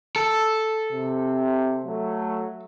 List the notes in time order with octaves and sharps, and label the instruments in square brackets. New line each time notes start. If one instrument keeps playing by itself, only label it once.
[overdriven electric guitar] A4
[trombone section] C3
F#3 A3